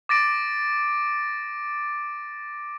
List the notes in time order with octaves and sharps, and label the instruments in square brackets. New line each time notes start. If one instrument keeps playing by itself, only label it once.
[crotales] D6 A6 A#6 D7